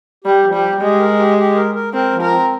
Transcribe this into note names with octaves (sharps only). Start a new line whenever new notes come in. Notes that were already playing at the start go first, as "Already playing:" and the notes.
G3 G4
F3
G3
G4
G#3 G4
A#4
G4
G4
A#4
A#4
C4 A#4
F3
A#4
C4